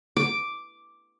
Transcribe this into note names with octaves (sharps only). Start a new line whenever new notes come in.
D6